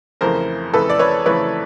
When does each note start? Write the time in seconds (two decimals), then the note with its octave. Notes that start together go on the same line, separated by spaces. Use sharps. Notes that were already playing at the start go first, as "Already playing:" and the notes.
0.21 F2 C#3 E3 A3 A#4 C5
0.73 F2 C#3 E3 A3 A4 B4
0.90 D5
0.99 B4 C#5
1.26 F2 C#3 E3 A3 B4 C#5